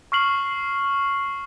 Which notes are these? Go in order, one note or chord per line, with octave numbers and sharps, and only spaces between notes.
C#6 F6 C7 F#7